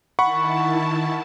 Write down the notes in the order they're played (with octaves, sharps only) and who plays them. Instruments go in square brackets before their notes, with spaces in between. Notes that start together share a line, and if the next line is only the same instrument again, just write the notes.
[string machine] D#3 E4 A5 [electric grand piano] F#5 B5 C#6